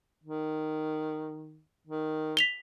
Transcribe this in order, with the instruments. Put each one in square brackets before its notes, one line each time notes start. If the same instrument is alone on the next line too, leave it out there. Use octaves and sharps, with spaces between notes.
[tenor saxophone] D#3
D#3
[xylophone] B6 F7 G7